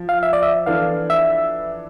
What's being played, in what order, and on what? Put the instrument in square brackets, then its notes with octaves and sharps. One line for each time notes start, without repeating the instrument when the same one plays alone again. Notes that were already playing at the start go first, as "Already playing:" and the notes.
Already playing: [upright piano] F3
[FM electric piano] F5
E5
D5
E5
[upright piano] E3 B3 D4 A4 [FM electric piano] F5
[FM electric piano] E5